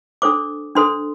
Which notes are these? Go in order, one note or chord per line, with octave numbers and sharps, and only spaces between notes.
D4 A4 C5 D6
D4 A4 C5 C6